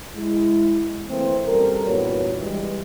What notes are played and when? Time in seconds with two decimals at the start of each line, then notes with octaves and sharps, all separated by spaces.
0.16 G#3 E4
1.09 E3 A3 A#3 C4
1.47 F#2 G3 C4 A4 A#4
1.85 E2 G2 A#2 F#4 B4 C#5
2.40 E3 G3 G#3